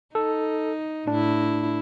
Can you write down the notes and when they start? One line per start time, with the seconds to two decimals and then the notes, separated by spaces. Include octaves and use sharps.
0.15 D#4 A4
1.08 A2 D4 E4